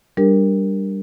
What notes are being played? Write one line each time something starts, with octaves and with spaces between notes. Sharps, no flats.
G3 D4 G4 A#4